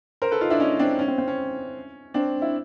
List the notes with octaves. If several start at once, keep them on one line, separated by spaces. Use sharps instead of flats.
A#4 C5
A4 B4
D#4 F4
D4 E4
C#4 D#4
C4 D4
C#4
C4
C4
C#4
C4 D4
E4